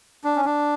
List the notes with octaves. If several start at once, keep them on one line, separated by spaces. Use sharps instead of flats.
D4
C#4
D4